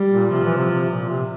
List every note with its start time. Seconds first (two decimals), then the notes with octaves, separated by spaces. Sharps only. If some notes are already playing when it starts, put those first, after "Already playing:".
Already playing: G3
0.11 A#2
0.31 C3 F3
0.44 E3
0.57 C3
0.70 C3
0.89 A#2
1.09 C3